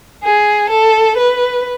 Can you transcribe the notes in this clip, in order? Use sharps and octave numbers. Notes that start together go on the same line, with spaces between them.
G#4
A4
B4